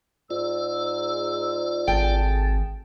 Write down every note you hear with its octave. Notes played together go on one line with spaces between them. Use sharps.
G#2 F4 D5 E6
G#1 G#4 A4 G5 A5